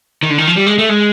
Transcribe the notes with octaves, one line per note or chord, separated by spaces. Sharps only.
D#3
D3
D#3
F3
G3
G#3
A3
G#3